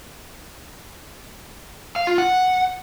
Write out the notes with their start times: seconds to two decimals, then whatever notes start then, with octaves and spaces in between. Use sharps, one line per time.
1.96 F5
2.07 F4
2.18 F#5